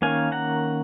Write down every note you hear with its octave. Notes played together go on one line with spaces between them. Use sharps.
D#3 A#3 C#4 F5 G#5
F#5 A#5